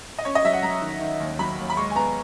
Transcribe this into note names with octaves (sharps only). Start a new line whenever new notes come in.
D#5
C#4 C#5
D#5
F#3 E5
F#5
F#3 A#5
D#3
D#3
D#2
F#3 B5
D#2
B5
G#3 C#6
G#5
B3 A#5